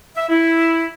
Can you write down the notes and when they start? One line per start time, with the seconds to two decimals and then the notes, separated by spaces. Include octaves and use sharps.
0.16 E5
0.29 E4